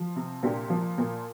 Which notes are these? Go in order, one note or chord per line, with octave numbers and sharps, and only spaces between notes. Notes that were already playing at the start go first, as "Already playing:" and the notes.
Already playing: F3
C3
A#2 D4 G4
F3
A#2